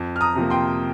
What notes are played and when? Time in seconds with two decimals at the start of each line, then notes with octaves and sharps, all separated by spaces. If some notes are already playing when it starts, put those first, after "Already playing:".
Already playing: F2
0.16 F6
0.21 A#5 D#6
0.35 C3 F3 A#3
0.50 G5 C6